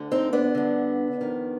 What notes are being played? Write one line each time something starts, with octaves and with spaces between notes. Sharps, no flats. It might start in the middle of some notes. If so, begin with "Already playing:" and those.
Already playing: D2 D3
C4 D#4
B3 D4
G2 D3
F2 D#3